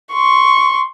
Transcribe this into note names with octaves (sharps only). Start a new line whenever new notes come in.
C6 C#6